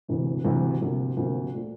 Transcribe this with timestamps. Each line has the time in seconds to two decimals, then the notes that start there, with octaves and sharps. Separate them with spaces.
0.08 E1 D2 C3 E3
0.45 E1 D2 C3 E3
0.81 D2 C3 F3 A#3
1.17 D2 C3 F3 A#3
1.54 A#2 A3